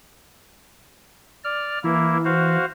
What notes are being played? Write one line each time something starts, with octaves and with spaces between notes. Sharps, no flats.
D5 F6
E3 A#3 E4
F#4 C5 F5